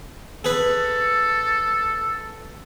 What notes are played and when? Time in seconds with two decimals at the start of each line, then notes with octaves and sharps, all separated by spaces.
0.45 G#4 A4 B4